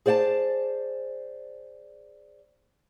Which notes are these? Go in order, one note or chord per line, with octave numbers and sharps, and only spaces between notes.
G#4 C5 D5 G5 A5